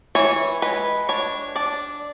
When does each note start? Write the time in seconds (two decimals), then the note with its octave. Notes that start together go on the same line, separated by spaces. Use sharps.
0.15 E3 C#5
0.62 G#3 B4
1.09 D4 C#5
1.56 D4 D5